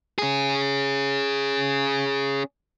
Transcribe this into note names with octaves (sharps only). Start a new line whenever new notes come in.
C#4 G#4